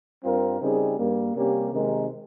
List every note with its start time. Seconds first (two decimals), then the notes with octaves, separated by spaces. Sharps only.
0.23 G2 G3 C4 F4 A#4
0.60 C#3 G3 C4 D#4 G#4
0.97 G2 G3 A#3
1.34 C3 G3 A#3 C#4 G4
1.71 C3 D#3 G#3 D#4 A#4